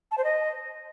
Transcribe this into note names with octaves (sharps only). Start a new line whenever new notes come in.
A5
C5
D#5